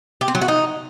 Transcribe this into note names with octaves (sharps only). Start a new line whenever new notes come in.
G4
C4
F#3
F#4
D#4